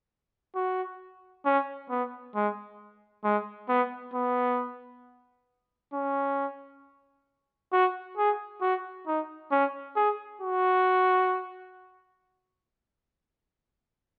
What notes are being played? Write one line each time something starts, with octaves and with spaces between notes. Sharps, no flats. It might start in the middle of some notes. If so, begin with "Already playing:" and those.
F#4
C#4
B3
G#3
G#3
B3
B3
C#4
F#4
G#4
F#4
D#4
C#4
G#4
F#4